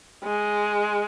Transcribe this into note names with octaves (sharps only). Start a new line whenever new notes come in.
G#3